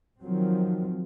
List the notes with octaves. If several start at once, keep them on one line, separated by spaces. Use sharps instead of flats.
D#3 F3 F#3 C4